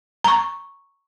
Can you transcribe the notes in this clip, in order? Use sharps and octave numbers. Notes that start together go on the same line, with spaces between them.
A#5 C#6